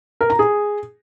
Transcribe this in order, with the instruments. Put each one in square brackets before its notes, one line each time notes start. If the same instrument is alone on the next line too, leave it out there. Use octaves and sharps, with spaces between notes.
[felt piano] A#4
A#5
G#4